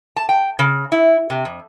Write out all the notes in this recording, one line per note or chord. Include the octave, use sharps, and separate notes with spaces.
A5
G5
C#3
E4
C3
F2